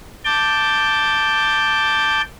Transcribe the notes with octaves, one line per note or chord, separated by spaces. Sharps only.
A5 D6 G6